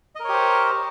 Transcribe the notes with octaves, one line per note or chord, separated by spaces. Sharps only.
G4 A#4 C5 C#5 D#5